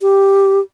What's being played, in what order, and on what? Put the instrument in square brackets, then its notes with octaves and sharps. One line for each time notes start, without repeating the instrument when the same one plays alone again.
[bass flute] G4